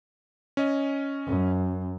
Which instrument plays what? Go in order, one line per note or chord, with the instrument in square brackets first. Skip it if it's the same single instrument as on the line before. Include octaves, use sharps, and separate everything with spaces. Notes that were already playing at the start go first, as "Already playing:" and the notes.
[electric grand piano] C#4 D#5
[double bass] F#2